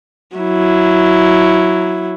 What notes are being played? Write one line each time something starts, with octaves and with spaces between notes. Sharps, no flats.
F#3 E4